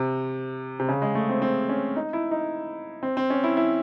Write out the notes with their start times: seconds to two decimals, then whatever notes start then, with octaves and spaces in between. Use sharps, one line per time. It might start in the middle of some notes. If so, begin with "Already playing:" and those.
Already playing: C3
0.80 C3
0.89 C#3
1.02 G#3
1.15 A3
1.29 C4
1.42 C4
1.69 C#4
1.96 D#4
2.13 E4
2.31 D#4
3.03 C4
3.17 C4
3.30 C#4
3.44 E4
3.57 E4